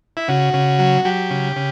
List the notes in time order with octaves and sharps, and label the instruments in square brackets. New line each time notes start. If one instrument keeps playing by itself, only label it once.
[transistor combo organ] E4
C#3 F#4
C#3
F#3
F#3 G4
C#3
C#3